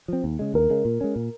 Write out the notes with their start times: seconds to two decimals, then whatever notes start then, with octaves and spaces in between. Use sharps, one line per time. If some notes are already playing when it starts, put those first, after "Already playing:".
0.08 F3 C4
0.24 D#2
0.39 C#3 G#3
0.54 D#2 A#4
0.70 C#3 G#3
0.85 A#2
1.01 G#3 C#4
1.16 A#2